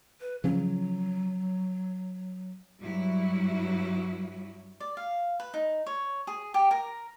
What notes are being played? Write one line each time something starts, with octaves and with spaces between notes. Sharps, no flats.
B4
C#3 F3 F#3 C#4
G2 F#3 G3 E4
D5
F5
B4
D#4
C#5
G#4
G4
A#4